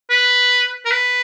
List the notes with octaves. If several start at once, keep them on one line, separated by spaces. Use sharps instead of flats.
B4
A#4
B4